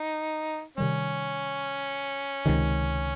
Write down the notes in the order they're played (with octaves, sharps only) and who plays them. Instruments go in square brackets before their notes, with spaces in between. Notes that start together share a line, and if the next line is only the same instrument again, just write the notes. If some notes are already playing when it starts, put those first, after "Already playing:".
Already playing: [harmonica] D#4
[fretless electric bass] C3 D#3 G3 [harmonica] C#4
[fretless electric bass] C#2 C3 D#3